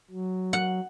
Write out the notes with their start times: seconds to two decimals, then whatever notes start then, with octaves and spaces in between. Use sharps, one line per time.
0.10 F#3
0.53 F#5